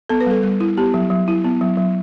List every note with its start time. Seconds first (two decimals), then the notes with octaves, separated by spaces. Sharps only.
0.09 B3 A4
0.20 B4
0.27 G3 A4
0.43 G3
0.60 E4
0.77 B3 G4
0.94 F#3
1.10 F#3
1.28 E4
1.44 B3
1.61 F#3
1.77 F#3